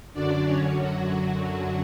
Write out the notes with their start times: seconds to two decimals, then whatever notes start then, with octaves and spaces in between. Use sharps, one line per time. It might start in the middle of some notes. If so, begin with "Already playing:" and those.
0.13 F#2 D3 F#3 D4 D5
0.45 C#4 C#5
0.78 F#3 F#4